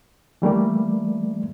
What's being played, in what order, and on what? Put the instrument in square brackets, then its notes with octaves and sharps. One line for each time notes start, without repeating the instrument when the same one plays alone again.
[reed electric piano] E3 G3 A3 A#3